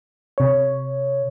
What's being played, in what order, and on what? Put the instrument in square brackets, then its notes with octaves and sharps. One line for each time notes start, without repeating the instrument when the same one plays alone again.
[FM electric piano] C3 C#5